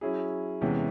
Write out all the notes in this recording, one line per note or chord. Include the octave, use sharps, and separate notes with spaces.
F#3 C#4 E4 G#4
E2 C3 E3 G#3 C#4